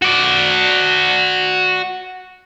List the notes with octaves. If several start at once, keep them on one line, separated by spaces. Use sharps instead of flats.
F#4 D5